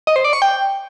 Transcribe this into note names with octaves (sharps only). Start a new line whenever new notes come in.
D#5
C5
D5
C#6
G5